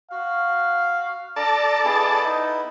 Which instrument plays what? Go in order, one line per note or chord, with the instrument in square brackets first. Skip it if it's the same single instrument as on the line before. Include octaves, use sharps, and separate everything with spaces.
[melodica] F#4 [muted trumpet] F5
[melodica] D4 A#5 [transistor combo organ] A4 D5 A5
[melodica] B3 E4 D#5 [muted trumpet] G#4
[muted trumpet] D#4